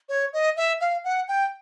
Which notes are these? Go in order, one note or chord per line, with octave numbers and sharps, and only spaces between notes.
C#5
D#5
E5
F5
F#5
G5